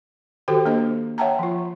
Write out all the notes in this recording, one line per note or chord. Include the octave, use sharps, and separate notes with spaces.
D#3 F#4 G4 A4 C5 G5
A#3 D4 C5 D#5
C#5 E5 F#5 G5 A5 A#5
F3 F4